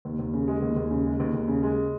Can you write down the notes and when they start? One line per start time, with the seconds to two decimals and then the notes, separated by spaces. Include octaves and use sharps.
0.05 D#2
0.19 D#2
0.34 C#3
0.48 G#3
0.62 D#2
0.76 D#2
0.91 C#3
1.06 G#3
1.20 D#2
1.34 D#2
1.48 C#3
1.63 G#3